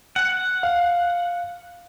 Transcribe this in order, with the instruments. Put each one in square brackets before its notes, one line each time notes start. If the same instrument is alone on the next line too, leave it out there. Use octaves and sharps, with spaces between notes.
[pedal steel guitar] F#5
[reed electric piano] F5